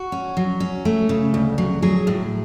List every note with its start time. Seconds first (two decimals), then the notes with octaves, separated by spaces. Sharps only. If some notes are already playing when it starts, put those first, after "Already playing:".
Already playing: F#4
0.12 C#4
0.37 F#3
0.60 C#4
0.85 A3
1.09 C#3
1.34 D2
1.58 F#3
1.82 F#3 G#4
2.07 A2